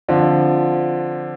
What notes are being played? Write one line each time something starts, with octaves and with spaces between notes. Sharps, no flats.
D3 F3 C4 F4